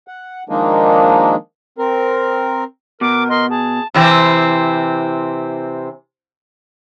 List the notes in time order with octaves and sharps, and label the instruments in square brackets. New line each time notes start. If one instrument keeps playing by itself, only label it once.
[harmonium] F#5
D#3 F3 G#3 A#3 D4 D#4
C4 A#4
[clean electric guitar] B2 [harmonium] A#4 [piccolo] D6
[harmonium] A#4 D#5 [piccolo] C6
[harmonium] G#4 [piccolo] A5
[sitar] C3 E3 C4